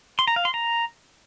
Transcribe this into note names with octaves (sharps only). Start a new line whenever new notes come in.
C6
A#5
F5
C6
A#5